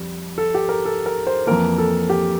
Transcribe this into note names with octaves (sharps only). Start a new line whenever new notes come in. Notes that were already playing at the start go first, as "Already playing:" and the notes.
Already playing: F2 G3
A4
G4
A#4
A4
A#4
C5
F2 E3 A#3 A#4
A4
G4